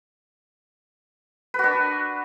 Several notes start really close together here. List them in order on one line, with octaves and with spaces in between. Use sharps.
B4 F#4 D4